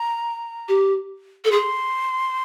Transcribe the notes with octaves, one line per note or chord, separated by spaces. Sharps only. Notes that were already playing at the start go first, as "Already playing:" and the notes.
Already playing: A#5
G4
A4
G#4 C6